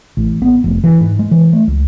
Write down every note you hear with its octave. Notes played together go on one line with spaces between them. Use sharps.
A1
B3
F1
E3
G#2
G#3
E3
A3
C#2